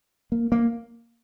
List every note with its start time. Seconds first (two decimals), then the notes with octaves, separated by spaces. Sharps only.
0.32 A#3
0.52 A#3